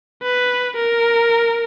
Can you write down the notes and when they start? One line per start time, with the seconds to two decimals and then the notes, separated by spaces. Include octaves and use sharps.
0.23 B4
0.77 A#4